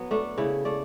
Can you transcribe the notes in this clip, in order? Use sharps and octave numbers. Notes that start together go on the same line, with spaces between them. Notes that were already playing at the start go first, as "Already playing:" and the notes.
Already playing: F#3 B3
A3 D4
C#3 E4
A3 D5